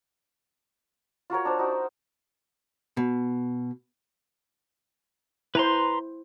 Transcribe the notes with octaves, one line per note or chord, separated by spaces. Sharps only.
F4 F#4 A#4 C#5
D4 C5
D#4 F#4
B2
E4 B4 C5 A#5 C6